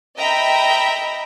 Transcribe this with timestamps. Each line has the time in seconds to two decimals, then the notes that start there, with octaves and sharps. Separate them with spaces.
0.17 D#5 E5 G5 A#5 B5